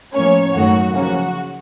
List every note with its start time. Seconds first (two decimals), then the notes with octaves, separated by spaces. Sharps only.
0.14 A2 F3 A#3 C#4 C#5
0.54 F#2 D#3 A3 F#4
0.94 C#3 F3 A#3 C#4 F#4